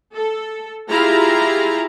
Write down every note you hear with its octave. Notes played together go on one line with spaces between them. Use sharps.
A4
E4 F4 G4 G#4 F5 A#5